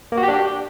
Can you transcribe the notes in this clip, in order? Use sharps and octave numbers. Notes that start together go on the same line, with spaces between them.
A#3
F#4
G4
D4
G4